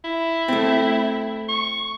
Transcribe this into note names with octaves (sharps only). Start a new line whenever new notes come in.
E4
A3 C4
C#6